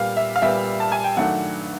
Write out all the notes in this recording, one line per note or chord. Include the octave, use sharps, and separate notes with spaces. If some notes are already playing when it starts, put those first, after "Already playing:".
Already playing: A#2 G3 B3 F5
E5
F5
A#2 G3 B3 E5
A5
G#5
G5
G2 D#3 F#3 A3 D4 F#5